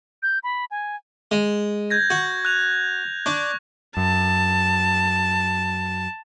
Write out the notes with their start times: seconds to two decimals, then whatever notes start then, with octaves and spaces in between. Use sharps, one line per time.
0.23 G6
0.44 B5
0.71 G#5
1.31 G#3
1.90 G6 G#6 A#6
2.10 F#4
2.45 F#6 F7
3.26 D4 C#6
3.97 F#2 A5